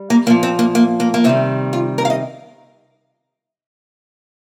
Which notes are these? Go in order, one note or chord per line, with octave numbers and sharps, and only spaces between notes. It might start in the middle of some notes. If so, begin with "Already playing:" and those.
Already playing: G3
A#3
A#2 F3 A#3
C4
A#3
A#3
A#3
A#3
C3 D#3 G3 C4
F4
A#4
F5
D#5